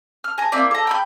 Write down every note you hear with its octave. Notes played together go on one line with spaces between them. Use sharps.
F6
G#5 A#5
A#3 C4 E4 D5
A4 A#5
G5 B5 G6